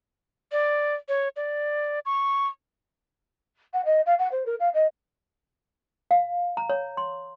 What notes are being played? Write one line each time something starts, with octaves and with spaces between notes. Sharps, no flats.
D5
C#5
D5
C#6
F#5
D#5
F5
F#5
C5
A#4
F5
D#5
F5
A#5
C#5
C6